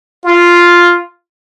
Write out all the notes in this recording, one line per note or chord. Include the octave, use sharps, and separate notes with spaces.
F4